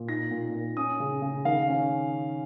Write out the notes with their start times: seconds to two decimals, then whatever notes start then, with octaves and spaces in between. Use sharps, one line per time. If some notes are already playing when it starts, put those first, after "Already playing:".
Already playing: A#2
0.08 D#4 A#6
0.31 A#2
0.54 A#2
0.77 C#4 D#6
1.00 C#3
1.22 C#3
1.45 D#3 F5
1.68 C#4